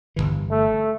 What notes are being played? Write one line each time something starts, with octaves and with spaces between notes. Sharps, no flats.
G1 C#2 E3
A3